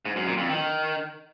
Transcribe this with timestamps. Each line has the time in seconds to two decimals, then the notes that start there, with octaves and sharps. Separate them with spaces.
0.05 G#2
0.16 F#2
0.27 A#2
0.38 F2
0.49 D#3